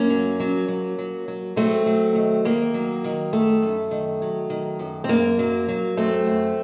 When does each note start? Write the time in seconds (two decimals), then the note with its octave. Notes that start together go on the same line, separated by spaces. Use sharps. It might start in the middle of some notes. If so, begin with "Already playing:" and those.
Already playing: F#2 A#3 C#4
0.10 F#3
0.40 F#3
0.68 F#3
0.98 F#3
1.28 F#3
1.56 F#3 A3 C4
1.86 F#3
2.15 D#3
2.45 D#3 A#3
2.74 F#3
3.04 D#3
3.33 F#2 A3
3.62 F#2
3.91 D#3
4.22 F#3
4.50 D#3
4.79 F#2
5.04 C4
5.09 F#2 A#3
5.39 F#3
5.68 F#3
5.97 F#2 A3 C4
6.26 F#2